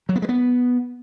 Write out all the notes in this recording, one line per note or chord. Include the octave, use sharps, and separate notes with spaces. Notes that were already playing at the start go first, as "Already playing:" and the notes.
F#3
B3
G#3
B3